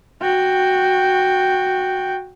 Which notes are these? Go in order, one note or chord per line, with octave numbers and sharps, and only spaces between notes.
F#4 G5